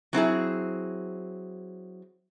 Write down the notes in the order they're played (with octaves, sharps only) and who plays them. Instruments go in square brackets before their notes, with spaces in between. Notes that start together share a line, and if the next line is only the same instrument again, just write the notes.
[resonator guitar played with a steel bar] F#3 C4 E4 G#4